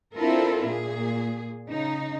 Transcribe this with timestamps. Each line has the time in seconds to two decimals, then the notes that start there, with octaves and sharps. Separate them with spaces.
0.15 C4 D4 E4 F4 A4 A#4
0.67 A#2 G#4
1.69 C#3 D#4